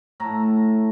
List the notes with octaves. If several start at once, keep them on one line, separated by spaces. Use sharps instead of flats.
A2 A3 A5 A#5